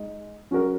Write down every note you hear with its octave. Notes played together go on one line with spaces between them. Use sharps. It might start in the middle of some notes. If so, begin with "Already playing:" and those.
Already playing: G#3 D#4
F#3 C#4 F#4 A#4